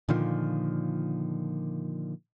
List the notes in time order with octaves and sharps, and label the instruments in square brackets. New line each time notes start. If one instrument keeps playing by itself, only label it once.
[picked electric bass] A#2 D3 D#3 F3